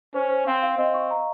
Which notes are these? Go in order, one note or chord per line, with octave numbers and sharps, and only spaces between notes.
C#4 C5
C5
C4 F5
F5
C4 D#5
C#6
A#5